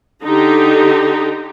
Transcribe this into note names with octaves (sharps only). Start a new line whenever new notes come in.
D3 D#4 G4